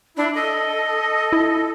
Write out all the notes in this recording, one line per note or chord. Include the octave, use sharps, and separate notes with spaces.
D4 E4
A4 D#5
E4